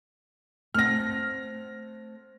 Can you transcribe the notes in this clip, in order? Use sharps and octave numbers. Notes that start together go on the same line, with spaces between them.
A3 C4 F#5 F6 A#6